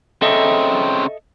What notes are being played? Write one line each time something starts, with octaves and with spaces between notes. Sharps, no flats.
C#3 C4 A4 D#5 E5